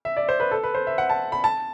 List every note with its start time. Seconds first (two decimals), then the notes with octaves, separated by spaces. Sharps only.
0.05 E5
0.17 D5
0.29 C5
0.40 B4
0.51 A4
0.63 B4
0.75 C5
0.87 E5
0.98 F#5
1.10 A5
1.32 B5
1.44 A5